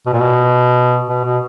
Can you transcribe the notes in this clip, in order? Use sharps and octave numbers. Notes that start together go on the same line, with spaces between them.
B2
A#2
B2
B2
B2